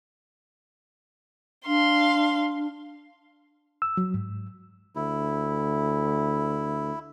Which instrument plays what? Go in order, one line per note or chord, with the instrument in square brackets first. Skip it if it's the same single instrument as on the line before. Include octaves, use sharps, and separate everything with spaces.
[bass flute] D4 [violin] F5 C6
[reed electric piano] E6
F#3
G#2
[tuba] D2 [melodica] E4